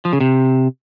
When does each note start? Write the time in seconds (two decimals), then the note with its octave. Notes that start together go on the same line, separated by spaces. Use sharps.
0.05 F3
0.13 C#3
0.21 C3